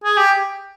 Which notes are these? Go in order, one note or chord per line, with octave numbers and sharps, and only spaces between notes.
G#4
G4